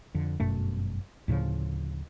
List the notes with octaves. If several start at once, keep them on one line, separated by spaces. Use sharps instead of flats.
F2 D3
G1 F#2 B2 A3
D2 A2 C#3 F3